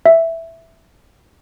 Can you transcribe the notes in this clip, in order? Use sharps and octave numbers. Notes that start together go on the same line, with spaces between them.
E5